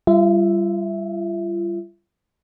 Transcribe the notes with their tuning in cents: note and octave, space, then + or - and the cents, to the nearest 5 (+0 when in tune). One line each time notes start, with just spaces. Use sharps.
G3 +0 F4 -35 E5 +0